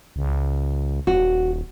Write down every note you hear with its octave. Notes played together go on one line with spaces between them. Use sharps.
C#2
D#1 F#4